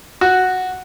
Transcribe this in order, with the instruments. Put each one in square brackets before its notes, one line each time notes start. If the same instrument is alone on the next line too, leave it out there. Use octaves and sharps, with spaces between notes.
[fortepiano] F#4